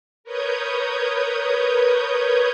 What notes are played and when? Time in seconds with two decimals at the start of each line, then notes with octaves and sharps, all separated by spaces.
0.24 A#4 B4 C#5 D#6 G6 G#6